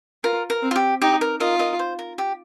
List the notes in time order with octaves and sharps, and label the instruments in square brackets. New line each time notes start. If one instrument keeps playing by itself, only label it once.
[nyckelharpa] F4 [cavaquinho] A#4
[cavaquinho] A#4
[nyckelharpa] C4
[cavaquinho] F4
G4
[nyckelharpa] D#4 [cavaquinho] G4
[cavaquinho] A#4
[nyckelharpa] F4 [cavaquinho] A#4 D#5
[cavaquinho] A#4 D#5
C5
A#4
G4